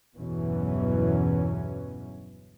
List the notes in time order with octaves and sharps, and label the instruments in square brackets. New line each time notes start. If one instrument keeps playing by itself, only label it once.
[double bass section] G1 E2 B2 E3 F#3 C#4